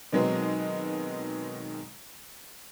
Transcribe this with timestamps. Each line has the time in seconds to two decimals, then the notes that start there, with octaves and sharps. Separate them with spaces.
0.12 B2 D#3 F#3 G#3 B3 C4